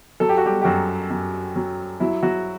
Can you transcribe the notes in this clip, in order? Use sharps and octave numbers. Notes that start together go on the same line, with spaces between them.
F#3 A4
G4
F#4
G3 G4
G4
F#2 F#3 F#4
F#2
F#3
F#3 E4
F#3 F#4